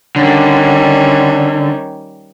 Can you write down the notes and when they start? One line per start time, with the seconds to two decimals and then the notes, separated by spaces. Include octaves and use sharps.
0.16 D3 D#3 G3 C#4